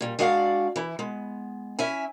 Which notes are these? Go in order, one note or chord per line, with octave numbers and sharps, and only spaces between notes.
A#2 G3
G#3 D4 F#4 D5 D#5 F5
E3 E4
G#3 B3
C#4 E4 E5 G#5